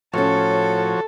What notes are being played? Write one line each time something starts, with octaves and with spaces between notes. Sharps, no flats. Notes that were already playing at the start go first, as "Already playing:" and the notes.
A2 F3 C#4 F#4 A4 C#5